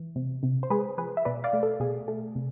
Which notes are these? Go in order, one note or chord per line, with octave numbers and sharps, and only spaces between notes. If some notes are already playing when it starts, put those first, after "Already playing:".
Already playing: E3
C3
C3
C5
G#3 G#4 B4
F3 G#4 B4
E5
B2 B4 D5
D5 F5
A3
A4
B2 G#4
A3
C3